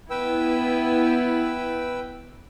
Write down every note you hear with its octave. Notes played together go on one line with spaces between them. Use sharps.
B3 E4 B4 G5 E6